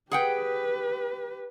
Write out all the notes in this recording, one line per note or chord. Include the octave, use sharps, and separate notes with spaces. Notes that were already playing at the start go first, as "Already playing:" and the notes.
G4 G#4 B4 F#5 G5